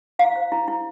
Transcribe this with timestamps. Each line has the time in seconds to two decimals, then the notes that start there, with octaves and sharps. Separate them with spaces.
0.19 E4 F5
0.36 C5
0.52 E4
0.68 E4